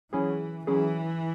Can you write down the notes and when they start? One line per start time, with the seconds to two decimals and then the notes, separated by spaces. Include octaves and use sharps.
0.12 E3 F#3 C#4 E4 G#4
0.67 E3 F#3 C#4 E4 G#4